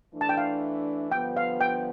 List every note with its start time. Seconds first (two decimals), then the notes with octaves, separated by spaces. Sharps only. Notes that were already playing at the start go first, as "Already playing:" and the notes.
0.14 E3 A3 D4
0.21 A5
0.29 G5
0.37 F5
1.12 G2 D3 F3 B3 G5
1.37 F5
1.61 G5